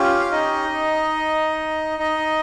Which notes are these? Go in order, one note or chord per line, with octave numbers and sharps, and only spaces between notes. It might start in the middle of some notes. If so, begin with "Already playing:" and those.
Already playing: C#4 F4 G4
F5
D#4 D#5
D#4 D#5